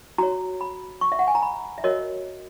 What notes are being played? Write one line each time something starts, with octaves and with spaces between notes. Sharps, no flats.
F#4 C#5 A#5
B5
C#6
E5
F#5
G#5
A#5
B5
E5
F#4 A#4 C#5 D#5